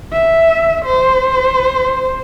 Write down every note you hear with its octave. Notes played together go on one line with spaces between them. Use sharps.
E5
C5